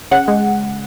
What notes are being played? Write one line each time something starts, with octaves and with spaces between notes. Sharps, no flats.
C#3 F#5
G#3